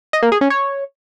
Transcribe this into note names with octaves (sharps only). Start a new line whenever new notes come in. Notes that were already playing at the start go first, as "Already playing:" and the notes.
D#5
A#3
G#4
C#4
C#5